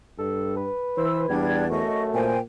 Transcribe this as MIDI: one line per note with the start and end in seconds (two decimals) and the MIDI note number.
0.19 0.68 43
0.19 0.56 69
0.57 1.54 71
0.97 1.26 52
0.97 1.28 72
0.97 1.19 88
1.29 1.82 40
1.29 1.64 55
1.29 1.68 62
1.29 1.68 92
1.70 2.31 42
1.70 2.32 57
1.70 2.02 75
1.70 2.02 85
2.14 2.40 46
2.14 2.38 72
2.14 2.38 79
2.14 2.38 80